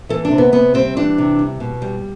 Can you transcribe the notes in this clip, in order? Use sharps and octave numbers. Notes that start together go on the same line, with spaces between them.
E3 A4
D4
C3
B3
C3 B3
G3 C4
E3 D4
C3
G3
B2
G3